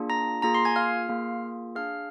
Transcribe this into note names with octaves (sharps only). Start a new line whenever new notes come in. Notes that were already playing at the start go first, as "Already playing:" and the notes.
Already playing: A#3 D4 F4 G#4
A#5 A#6
A#3 F4 G#4 A#5 A#6
C6 C7
G#5 G#6
F5 F6
A#3 F4 G#4
D4 G#4 F5 F6